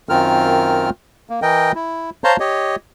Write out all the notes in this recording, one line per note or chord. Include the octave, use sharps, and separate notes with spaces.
F#2 D#3 C4 F4 A#4 F6
A#3
E3 A#4 D#5 G5
E4
C5 C#5 F5 A5 A#5 C6
G4 C#5 D#5